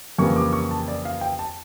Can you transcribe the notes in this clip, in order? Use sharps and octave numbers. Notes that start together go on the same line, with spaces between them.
F2 C#3 E3 G3 A#3 C#6
D6
C#6
A5
D5
F5
G5
A5